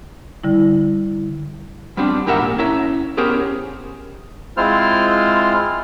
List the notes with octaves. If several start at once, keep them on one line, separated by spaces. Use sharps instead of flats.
D3 G3 E4
G3 B3 C4 D4
E2 G#2 G4 A#4 E5 F#5
A#2
C#4 E4 E5 A#5
B3 C#4 G4 G#4 A#4 C5
G#3 C4 E4 F4 C5 F6